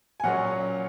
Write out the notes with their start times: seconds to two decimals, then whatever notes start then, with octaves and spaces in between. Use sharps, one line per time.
0.20 G#5
0.24 A#2 F#3 C#4 F#5